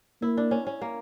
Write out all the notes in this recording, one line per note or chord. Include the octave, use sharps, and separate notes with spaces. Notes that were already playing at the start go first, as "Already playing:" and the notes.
A#3 E4
D4
C#4
C#4
A#3